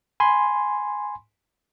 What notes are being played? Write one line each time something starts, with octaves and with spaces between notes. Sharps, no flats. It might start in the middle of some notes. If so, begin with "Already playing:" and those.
G#5 B5 C6